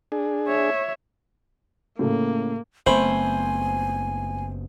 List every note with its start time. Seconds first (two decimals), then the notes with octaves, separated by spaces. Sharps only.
0.12 D4 G#4
0.48 C#5 E5
1.99 A2 C#3 A#3 A4
2.86 F#1 A3 B3 C4 C5 G#5 B5